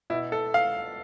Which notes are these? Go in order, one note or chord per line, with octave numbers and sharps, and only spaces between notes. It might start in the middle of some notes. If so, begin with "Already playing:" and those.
B2 E4
A4
F5